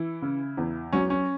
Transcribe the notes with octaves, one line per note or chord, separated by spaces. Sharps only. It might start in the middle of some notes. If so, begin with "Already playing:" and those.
Already playing: E3 E4
C#3
E2
F#3 C#4
C#4